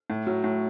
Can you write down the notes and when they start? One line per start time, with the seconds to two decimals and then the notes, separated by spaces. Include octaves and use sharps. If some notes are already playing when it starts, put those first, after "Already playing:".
0.10 A2
0.27 F#3
0.44 A2